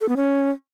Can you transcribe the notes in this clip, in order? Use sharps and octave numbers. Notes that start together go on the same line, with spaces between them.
A4
B3
C#4